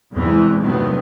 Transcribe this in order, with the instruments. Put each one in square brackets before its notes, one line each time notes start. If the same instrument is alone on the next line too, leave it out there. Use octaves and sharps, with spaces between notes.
[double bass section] E2 G2 C3 E3 G#3
G2 C3 D#3 F#3 A3 B3